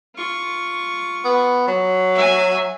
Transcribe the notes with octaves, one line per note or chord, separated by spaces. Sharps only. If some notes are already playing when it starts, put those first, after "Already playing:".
F4 C#6
B3
F#3
E5 G#5